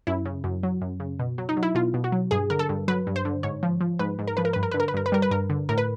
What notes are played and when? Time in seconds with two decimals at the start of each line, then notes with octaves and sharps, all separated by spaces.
0.07 F#2 E4
0.25 C#3
0.44 F#2
0.63 F#3
0.81 F#2
1.00 C#3
1.19 B2
1.38 F#3
1.49 D#4
1.57 F#3
1.63 E4
1.75 B2 F4
1.94 B2
2.04 F#4
2.12 F#3
2.31 G2 G#4
2.50 D3 A#4
2.59 A4
2.69 G2
2.88 F#3 B4
3.07 G2
3.16 C5
3.25 D3
3.43 G#2 C#5
3.63 F3
3.81 F3
3.99 G#2 B4
4.19 G#2
4.27 A#4
4.37 F3 B4
4.45 A#4
4.53 G2 B4
4.63 A#4
4.71 D3 B4
4.80 A#4
4.88 B4
4.94 G2 A#4
5.06 B4
5.12 G3 A#4
5.22 B4
5.31 G2 A#4
5.50 D3
5.69 A2 A#4
5.78 B4